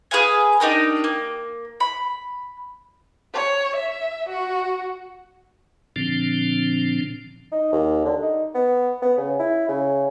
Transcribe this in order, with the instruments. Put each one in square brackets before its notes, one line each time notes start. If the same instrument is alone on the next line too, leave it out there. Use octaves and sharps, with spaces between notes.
[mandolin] G#4 B4 F5 G#5
D4 D#4 G4 A#4
A#3
B5
[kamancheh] C#5
E5
F#4
[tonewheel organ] A#2 D3 F3 C4 D4
[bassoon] D#4
D#2
D3
D#4
B3
B3
C#3
E4
C#3